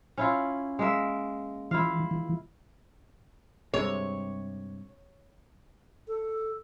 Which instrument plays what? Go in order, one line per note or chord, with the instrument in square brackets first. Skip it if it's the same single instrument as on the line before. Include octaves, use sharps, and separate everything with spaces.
[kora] C#4 E4 F4
G#3 A#3 E5
[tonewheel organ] E3 [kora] E4 F4 F5
[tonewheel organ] E3
[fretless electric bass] G2 C3 G#3 [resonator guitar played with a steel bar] C#5
[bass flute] A4